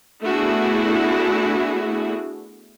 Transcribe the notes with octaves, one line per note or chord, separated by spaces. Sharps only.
A3 B3 D4 E4 F#4 G#4